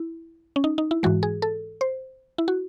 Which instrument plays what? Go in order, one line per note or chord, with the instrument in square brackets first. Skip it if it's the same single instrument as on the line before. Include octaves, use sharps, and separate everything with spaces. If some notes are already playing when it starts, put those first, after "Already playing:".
Already playing: [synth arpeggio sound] E4
C#4
D#4
D#4
E4
G#2 E3 G#3 F#4
G#4
A4
C5
E4
F#4